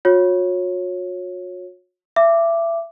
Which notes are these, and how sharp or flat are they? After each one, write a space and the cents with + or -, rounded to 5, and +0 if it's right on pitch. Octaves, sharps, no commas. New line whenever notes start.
F#4 -45 C#5 -10
E5 +25 D6 +0